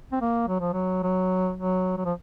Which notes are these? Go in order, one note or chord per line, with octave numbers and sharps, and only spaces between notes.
C4
A#3
F#3
F3
F#3
F#3
F#3
F#3
F3